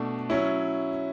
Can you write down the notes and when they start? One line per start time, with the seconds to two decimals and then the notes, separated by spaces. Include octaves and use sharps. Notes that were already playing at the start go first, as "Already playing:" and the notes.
Already playing: B2 A3 D4
0.30 F#3 C#4 E4